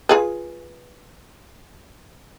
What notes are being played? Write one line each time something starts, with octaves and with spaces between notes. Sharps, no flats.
F4 G#4 B4